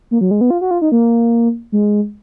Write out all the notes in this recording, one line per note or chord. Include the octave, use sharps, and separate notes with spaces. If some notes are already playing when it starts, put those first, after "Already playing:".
A#3
F#3
G#3
B3
F4
F#4
F4
D#4
A#3
G#3